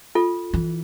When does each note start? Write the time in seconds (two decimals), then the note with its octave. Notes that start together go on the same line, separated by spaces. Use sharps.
0.15 F4 A4
0.54 E3